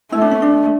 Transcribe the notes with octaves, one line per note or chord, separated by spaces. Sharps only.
A3 E4
D4
C#4
D4